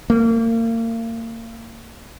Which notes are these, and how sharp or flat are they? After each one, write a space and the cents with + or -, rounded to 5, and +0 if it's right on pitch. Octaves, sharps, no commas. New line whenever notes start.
A#3 -35